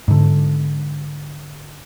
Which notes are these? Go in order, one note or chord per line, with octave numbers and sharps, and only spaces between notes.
G#2 D3